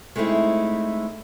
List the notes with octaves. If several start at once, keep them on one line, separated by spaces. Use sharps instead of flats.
G#3 A3 C4 D#4 E4